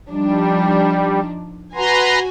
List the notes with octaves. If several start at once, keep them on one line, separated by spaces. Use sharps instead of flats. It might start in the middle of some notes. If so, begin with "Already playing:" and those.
F3 G3 D4 D#4
F#4 B4 G#5 A#5 C6